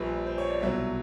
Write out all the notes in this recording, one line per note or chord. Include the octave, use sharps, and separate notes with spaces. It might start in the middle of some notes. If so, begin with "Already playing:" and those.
Already playing: A#1 A#2 G3 B4
C5
C#5
D5
C2 B2 F#3 E5